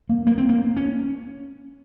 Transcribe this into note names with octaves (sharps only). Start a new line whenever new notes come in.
A#3
A#3
C4
A#3
C#4